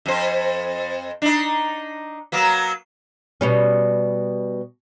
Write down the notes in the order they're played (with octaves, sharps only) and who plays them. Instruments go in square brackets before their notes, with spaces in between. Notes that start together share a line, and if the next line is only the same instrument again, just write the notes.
[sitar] F2 C5
D4 D#4
F#3 A#3 B3
[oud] B2 G3 C#4